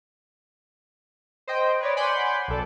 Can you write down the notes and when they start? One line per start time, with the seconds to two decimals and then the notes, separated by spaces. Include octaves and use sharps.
1.47 C5 D#5 G5
1.80 B4 C#5 D5
1.96 F#5 G#5 B5 C6 D6 G6
2.48 B1 A4 D5